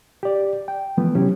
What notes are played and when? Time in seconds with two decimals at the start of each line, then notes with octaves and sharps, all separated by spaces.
0.23 G4 D5
0.68 G5
0.97 E3 F3 G#3 A3 B3
1.15 C3 F#3 C#4 E4 G4